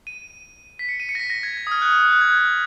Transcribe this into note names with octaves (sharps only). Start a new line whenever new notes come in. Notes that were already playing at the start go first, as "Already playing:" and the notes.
D#7
B6
C#7
D#7
C#7
A#6
B6
A#6
G#6
G#6
D#6
F6
F#6
F#6
F#6
G#6
F#6